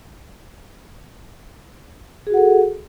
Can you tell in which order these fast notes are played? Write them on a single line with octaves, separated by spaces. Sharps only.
G#4 F#4 F#5 A4